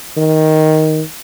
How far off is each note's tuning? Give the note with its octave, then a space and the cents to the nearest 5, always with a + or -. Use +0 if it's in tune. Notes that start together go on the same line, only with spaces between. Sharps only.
D#3 +10